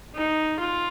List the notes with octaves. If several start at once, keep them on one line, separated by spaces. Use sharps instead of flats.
D#4
F4